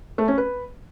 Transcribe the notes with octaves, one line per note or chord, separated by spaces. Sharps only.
A3
C#4
B4